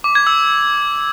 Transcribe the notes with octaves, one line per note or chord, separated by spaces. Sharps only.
D6
G#6
E6